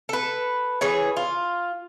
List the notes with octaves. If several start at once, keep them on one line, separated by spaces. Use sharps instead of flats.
A4 B4
E3 G#4 C#5
F4